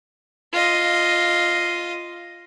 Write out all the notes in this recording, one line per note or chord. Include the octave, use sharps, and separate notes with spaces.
F4 D#5